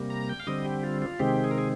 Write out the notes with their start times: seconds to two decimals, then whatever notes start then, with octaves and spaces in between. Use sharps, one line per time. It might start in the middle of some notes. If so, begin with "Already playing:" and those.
Already playing: C3 G3 A#3
0.10 A#5
0.29 G5
0.40 F5
0.47 D3 G3 C4 D#5
0.65 G4
0.83 F4
1.02 F4
1.19 C3 D#3 G#3 C4 G4
1.44 G#4
1.51 A#4
1.58 G#4